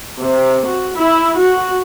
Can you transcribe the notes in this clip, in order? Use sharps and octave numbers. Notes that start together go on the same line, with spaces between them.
C3
F#4
E4
F#4